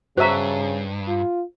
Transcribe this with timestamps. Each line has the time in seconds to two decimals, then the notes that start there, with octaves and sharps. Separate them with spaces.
0.17 G2 C#3 F#4 C5 E5 A#5
1.08 F4